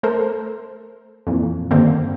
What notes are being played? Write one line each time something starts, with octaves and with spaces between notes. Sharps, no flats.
A3 A4 A#4 C5
F2 A#2 E3
G2 D3 D#3 A#3 C4